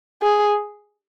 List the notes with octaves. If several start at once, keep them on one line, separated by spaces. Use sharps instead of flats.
G#4